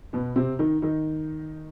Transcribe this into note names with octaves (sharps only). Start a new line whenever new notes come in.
B2 B3
C3 C4
D#3 D#4
D#3 D#4